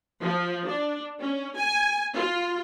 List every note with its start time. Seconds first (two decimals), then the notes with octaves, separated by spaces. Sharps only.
0.20 F3
0.66 D4
1.19 C#4
1.56 G#5
2.15 F4